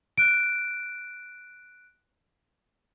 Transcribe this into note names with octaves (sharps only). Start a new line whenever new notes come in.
F#6 D7